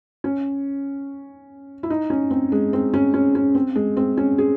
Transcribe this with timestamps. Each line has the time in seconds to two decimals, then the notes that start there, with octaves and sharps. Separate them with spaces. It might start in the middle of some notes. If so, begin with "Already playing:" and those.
0.24 C#4
1.83 E4
1.90 D#4
2.10 C#4
2.31 C4
2.52 G#3
2.73 C4
2.94 C#4
3.14 C#4
3.35 C#4
3.55 C4
3.76 G#3
3.97 C4
4.17 C#4
4.38 G#4